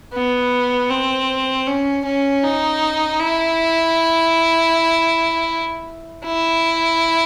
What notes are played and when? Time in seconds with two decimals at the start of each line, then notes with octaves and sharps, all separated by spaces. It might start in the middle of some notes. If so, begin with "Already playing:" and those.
0.13 B3
0.89 C4
1.67 C#4
2.05 C#4
2.43 D#4
3.20 E4
6.25 E4